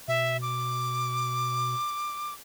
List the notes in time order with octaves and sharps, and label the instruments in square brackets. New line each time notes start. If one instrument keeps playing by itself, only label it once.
[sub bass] B2 [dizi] E5
[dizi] D6